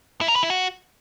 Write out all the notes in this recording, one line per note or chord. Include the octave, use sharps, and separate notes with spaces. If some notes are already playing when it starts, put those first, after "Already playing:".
E4
A#4
B4
E4
F#4